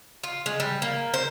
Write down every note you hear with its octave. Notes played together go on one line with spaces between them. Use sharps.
F4
G#3
G3
A#3
C5